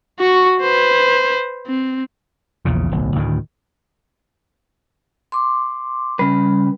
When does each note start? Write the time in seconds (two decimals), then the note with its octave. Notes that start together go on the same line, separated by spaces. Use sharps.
0.20 F#4 C#6
0.61 B4 C5
1.67 C4
2.65 A#1 E2 A#2 C#3
2.91 D1 B1
3.16 D2 A2 D#3
5.32 C6 D6
6.19 C#3 G3 B4